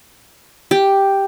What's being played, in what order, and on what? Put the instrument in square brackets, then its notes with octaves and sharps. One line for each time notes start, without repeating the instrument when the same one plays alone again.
[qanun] G4